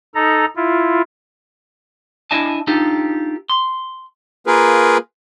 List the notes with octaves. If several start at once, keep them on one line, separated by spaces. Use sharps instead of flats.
D#4 A4 A#5
E4 F4
D4 E4 D#5 E5 G#5 A5
D4 D#4 F4 G4 A4
C6
A#3 F4 G#4 A#4 B4